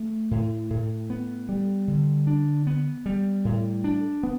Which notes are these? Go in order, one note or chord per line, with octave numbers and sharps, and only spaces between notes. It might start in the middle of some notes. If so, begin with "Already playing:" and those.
Already playing: A3
A2
A2
B3
G3
D3
D4
B3
G3
A2
D4
B3